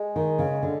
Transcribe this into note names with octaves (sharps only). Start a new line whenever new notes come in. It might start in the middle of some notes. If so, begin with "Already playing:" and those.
Already playing: G#3
D#3
C#3
D3